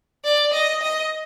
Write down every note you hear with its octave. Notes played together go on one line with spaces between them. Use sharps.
D5
D#5
D#5